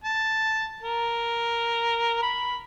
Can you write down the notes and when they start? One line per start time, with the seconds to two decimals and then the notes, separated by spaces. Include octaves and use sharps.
0.04 A5
0.82 A#4
2.22 B5